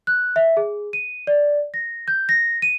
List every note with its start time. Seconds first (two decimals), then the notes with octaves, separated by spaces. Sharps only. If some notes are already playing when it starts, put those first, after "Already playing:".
0.07 F#6
0.36 E5
0.57 G#4
0.93 D#7
1.27 D5
1.74 A#6
2.08 G6
2.29 A#6
2.62 D#7